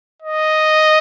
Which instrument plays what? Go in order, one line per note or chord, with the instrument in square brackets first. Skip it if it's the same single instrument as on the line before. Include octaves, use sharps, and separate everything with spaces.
[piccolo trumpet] D#5